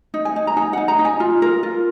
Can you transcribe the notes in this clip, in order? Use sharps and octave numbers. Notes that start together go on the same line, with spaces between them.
D#4
G#5
D#4
A#5
D#4 G#5
D#4 F#5
A#5
D#4
G#5
F4
A#4
F4